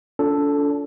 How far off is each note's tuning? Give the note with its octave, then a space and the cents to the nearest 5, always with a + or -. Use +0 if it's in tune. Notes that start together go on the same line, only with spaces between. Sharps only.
D4 -40 F4 +0 A4 +0